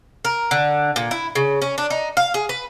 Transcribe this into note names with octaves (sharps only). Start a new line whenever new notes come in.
A#4
D3
A#2
E4
C#3
C#4
D4
D#4
F5
G#4
B4